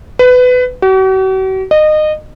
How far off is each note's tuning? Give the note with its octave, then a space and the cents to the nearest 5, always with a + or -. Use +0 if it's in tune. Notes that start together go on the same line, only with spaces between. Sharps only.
B4 +20
F#4 +45
D#5 -25